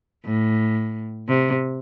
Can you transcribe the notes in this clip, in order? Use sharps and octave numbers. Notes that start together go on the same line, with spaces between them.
A2
C3